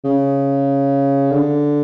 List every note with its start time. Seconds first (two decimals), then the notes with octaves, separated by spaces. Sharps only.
0.05 C#3
1.32 D3